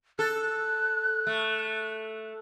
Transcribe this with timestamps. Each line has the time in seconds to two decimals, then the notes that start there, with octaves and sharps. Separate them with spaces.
0.19 A4 F#6
1.27 A3